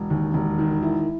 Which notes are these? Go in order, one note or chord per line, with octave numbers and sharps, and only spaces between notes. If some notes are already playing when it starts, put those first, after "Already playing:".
Already playing: E1
D#2
E1
D#3
E4